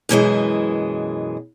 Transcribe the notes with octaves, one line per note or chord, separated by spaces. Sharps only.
F#2 B2 E3 G#3